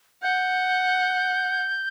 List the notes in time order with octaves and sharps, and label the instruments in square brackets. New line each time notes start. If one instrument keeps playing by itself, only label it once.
[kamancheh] F#5 [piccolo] G6